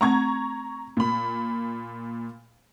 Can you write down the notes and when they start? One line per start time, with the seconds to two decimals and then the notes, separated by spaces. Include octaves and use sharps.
0.01 A3 C4 F#5 A#5 C#6 G#6
0.97 A#2 B5